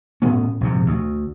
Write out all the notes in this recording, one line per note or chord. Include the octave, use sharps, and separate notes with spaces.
A2 B3 C#4
A#1 G#2 C3
D2